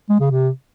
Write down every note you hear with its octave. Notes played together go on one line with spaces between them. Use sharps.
G#3
C#3
C3